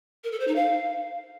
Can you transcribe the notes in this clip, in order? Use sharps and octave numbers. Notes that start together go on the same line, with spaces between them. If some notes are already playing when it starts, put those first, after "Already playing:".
A#4
A4
C5
D#4
F5